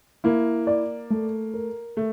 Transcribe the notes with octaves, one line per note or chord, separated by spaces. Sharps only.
A#3 E4
D5
A3
A#4
A3